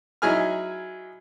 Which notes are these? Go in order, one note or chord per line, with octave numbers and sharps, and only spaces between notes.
F#3 D#4 E4 G#4 G#5 F6